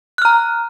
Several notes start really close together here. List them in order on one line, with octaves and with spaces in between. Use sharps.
F#6 F6 A#5